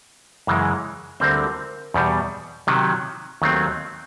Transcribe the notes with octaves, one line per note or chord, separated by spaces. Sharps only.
F#2 C#3 E3 G#3
D2 D3 G3 C4 A#4 C5
E2 B2 G3
C3 D#3 F#3
D#2 D#3 F#3 A3 C4